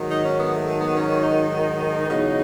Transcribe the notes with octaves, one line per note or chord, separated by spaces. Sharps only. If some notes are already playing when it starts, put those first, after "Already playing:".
Already playing: G#2 D#3 F#3
D#4
C#4
B3
A3
A3
B3
C#4
D#4
E2 C#3 F#3